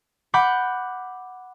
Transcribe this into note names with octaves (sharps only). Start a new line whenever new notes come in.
F#5 B5 D6 G6